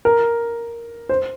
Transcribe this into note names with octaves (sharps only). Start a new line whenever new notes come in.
A#4
C5